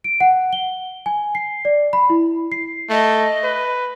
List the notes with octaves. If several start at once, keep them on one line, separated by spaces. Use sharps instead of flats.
D7
F#5
G7
G#5
C7
D5
B5
E4
C7
A3 D#5
B4